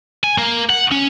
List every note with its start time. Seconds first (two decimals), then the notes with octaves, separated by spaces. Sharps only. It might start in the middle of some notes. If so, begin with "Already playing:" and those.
0.24 G#5
0.38 A#3
0.70 F#5
0.91 C#4